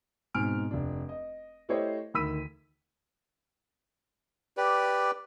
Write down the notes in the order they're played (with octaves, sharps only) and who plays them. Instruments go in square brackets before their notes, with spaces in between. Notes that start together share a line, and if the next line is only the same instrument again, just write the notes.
[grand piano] G#2 B2 C4 G#5 F6 D7
F1 D4
D#5
A3 E4 G4 C5 C#5 D#5
D2 D#3 B5 E6 B6 D#7
[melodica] G4 B4 D5